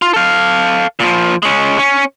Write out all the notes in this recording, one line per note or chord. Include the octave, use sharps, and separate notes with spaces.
F4
A4 F5
A#2 F3
G#3 C#4
C#4